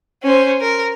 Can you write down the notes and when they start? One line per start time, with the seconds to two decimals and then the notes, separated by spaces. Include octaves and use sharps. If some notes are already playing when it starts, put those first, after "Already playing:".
0.23 C#4 C5
0.61 A#4